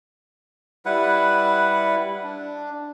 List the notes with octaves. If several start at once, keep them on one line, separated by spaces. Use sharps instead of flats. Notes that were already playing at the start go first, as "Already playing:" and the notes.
G3 E4 B4 F#5
D4